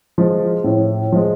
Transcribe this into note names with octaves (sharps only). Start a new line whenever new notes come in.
F3 G#3
A2
F3 G#3